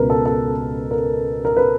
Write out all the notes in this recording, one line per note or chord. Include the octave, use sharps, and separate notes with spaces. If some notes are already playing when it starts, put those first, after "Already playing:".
Already playing: C#2 B2 A#4 B4
A4
A4
A#4
A#4
B4